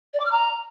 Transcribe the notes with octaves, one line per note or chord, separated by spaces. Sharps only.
D5
D6
F6
A#5